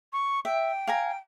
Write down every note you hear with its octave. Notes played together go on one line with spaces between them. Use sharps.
C#6
E5 G5
F5 G#5 A#5